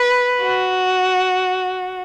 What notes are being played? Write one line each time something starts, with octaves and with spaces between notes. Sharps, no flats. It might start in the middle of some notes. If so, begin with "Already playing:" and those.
Already playing: B4
F#4